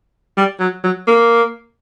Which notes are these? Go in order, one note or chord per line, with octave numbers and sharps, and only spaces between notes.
G3
F#3
F#3
A#3